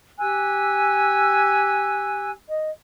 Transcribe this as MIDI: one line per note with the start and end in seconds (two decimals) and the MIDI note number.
0.19 2.30 67
0.19 2.30 80
0.19 2.30 88
0.19 2.30 90
2.47 2.69 75